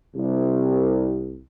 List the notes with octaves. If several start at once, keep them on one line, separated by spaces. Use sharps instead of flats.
C2